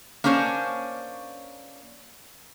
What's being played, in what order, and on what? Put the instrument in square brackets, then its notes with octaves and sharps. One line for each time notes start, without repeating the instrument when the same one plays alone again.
[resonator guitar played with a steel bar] A#3 C#4 D4 C5 C#5